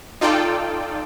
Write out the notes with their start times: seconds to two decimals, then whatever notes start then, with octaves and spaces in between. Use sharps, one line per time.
0.21 D#4 F4 A4 D5 G5